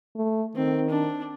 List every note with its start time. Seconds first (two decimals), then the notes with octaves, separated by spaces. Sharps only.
0.16 A3
0.56 D#3 C4
0.90 D4